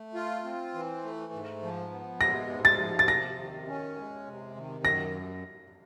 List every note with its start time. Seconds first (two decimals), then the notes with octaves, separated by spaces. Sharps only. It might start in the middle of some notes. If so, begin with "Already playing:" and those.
Already playing: A3
0.15 F4
0.44 C4
0.74 E3
1.03 A3
1.33 G#2
1.62 F3
1.90 B3
2.21 G#3 A#6
2.49 G#2
2.65 A6
2.79 F3
2.99 A6
3.08 C3 A#6
3.38 D#3
3.67 C#4
3.97 G#3
4.26 C3
4.56 D#3
4.84 F#2 A#6